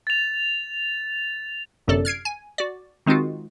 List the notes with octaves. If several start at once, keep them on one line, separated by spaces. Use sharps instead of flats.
A6 F7
G1 F#2 C3 A4 D5
F6 G#6 C7 D7
G#5
F#4 D5
D#3 G#3 C4 D#4 F4 F#4